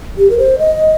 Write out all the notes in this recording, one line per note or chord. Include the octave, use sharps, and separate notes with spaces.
G4
A#4
C5
D#5